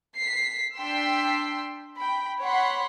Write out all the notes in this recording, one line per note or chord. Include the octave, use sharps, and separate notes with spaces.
B6 C7
D4 G5 C6 E6 B6
G5 B5
C#5 F#5 B5 C6